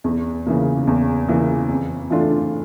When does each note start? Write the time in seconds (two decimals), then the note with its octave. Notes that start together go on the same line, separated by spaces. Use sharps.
0.04 E2
0.46 C#3 E3 A#3
0.87 E2
1.28 C#3 E3 A#3
1.69 F2
2.10 E3 A3 D4 F4